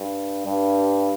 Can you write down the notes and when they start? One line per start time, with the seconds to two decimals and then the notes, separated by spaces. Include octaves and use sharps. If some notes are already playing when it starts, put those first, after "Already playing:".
Already playing: G2
0.46 G2